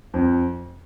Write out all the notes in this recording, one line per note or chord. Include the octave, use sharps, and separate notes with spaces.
F2